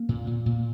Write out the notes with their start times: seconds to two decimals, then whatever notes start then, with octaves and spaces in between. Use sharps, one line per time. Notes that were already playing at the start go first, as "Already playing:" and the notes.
Already playing: A#3
0.09 A#2
0.27 A#2
0.46 A#2